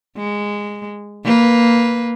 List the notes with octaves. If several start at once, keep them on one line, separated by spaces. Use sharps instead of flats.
G#3
A#3 B4